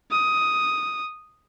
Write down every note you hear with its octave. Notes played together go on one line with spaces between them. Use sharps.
D#6